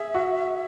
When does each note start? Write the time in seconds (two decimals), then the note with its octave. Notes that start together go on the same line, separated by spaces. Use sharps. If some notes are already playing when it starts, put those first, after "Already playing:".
Already playing: G#4 E5
0.14 F#4